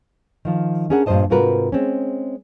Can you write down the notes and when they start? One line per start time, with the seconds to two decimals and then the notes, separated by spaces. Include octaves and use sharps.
0.45 D#3 F3
0.90 C#4 D4 G#4 A#4 F#5
1.06 G2 A#2 D#3 C5 D#5 A5
1.30 G#2 C3 F4 F#4 A#4 B4
1.72 G#3 C4 C#4